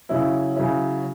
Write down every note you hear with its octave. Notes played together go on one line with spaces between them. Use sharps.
C#3 F#3 C#4 E4
C#3 F#3 C#4 E4